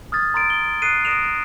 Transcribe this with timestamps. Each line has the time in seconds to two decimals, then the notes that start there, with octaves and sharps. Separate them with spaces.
0.12 D#6 F6 G#6 A6
0.34 A#5 C6 A6 D7
0.50 G7
0.82 D#6 F#6 C7 D#7
1.05 D#6 A#6 D7 E7 F7